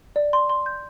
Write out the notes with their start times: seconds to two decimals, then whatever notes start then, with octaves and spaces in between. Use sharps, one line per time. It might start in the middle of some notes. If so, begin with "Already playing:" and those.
0.16 D5
0.33 C6
0.50 C6
0.66 G6